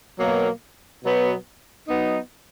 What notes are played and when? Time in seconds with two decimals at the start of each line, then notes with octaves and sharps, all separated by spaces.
0.18 B2 F#3 A#3
1.04 B2 F#3 B3
1.88 F#3 B3 D#4